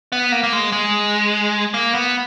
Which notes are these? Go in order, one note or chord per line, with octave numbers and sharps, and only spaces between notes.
B3
A#3
A#3
G#3
G#3
A#3
B3